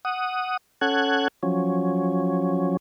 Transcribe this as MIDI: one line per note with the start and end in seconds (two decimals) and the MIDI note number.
0.05 0.57 78
0.05 0.57 87
0.81 1.28 61
0.81 1.28 69
0.81 1.28 78
0.81 1.28 90
0.81 1.28 92
1.43 2.77 53
1.43 2.77 54
1.43 2.77 61